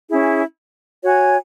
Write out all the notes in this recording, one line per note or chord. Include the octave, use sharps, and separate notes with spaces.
C#4 E4 G#4
F#4 C#5 G#5